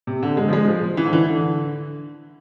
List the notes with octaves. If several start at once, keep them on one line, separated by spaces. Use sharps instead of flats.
C3
D3
G#3
F3
G#3
F3
E3
D3
E3
D3